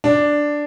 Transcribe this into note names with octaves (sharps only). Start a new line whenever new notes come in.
D4